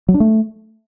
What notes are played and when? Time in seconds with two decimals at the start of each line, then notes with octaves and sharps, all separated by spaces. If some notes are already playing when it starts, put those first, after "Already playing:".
0.08 F#3
0.14 D4
0.20 A3